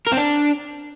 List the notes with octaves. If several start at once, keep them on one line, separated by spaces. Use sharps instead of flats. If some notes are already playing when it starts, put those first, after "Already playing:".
A#4
C4
D4